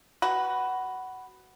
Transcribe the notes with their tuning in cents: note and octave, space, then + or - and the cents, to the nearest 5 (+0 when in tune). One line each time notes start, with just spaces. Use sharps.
F#4 +15 B4 +0